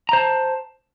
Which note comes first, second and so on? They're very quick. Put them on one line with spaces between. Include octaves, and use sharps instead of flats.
A#5 C5 A5